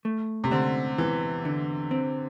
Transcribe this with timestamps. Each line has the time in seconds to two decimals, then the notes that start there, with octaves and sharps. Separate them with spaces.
0.05 A3
0.44 C3
0.51 D3 C4
0.98 E2 E3
1.45 D3
1.91 C4